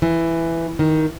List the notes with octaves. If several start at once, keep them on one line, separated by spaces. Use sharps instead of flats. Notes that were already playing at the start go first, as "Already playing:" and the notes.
E3
D#3